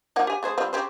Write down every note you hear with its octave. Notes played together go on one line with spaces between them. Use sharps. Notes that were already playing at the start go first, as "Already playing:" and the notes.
F3 A#3 F#5
G4 G#5
A3 G#4 C5
G3 C4 F4
C#3 G4 C5